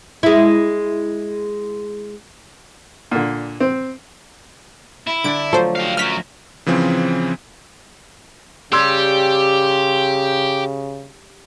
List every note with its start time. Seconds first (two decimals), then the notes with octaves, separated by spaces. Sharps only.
0.23 G#3 E4
3.11 A#2 D3
3.61 C4
5.07 E4
5.24 D3 D4 D7
5.53 F3 F#3 A3 A4 C5
5.75 G4 F5
5.97 F#2 F#3 F6 B6
6.66 C#3 E3 F3 C4
8.73 C#3 G3 G4 C6 E6 G#6